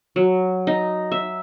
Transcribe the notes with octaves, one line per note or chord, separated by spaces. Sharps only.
F#3
D#4
E5